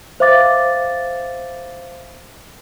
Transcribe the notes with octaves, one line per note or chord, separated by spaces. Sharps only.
C5 E5 F5 D6 A6